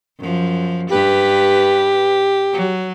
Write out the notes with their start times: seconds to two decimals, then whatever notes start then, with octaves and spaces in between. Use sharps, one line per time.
0.19 F#2 F3
0.90 G2 G4 B4
2.53 F#3